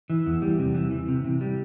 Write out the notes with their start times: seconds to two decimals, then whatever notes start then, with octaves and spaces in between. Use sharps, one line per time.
0.10 E3
0.26 E2
0.42 G3
0.59 C3
0.75 E3
0.91 E3
1.08 C3
1.24 C3
1.41 G3